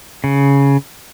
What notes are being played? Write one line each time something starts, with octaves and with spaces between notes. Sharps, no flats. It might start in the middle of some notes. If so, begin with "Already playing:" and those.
C#3